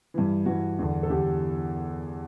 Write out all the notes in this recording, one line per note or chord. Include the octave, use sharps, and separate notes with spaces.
G2 E3
G2 E3 F#4
E2 D3
A4
E2 D3 G4